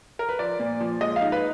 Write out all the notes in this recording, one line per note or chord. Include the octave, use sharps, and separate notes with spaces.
A#4
B4
F3 D5
A#2
F3
G#3 D#5
F5
D#4
B4